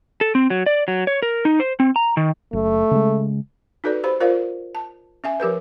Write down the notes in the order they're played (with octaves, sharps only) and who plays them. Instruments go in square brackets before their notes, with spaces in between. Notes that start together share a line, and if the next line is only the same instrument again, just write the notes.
[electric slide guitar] A4
C4
F#3
D5
F#3
C#5
A#4
D#4
C5
C4
A#5
D#3
[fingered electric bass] F#1 [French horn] A3
[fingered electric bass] C#3 G#3
[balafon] D#4 F#4 A4 B4 D5
G4 C5 B5
F4 A#4 C5 D5 F5
A5
C#4 E5 G#5
F3 G4 A#4 B4